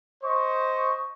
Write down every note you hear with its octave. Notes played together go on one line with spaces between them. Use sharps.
C5 D#5 C#6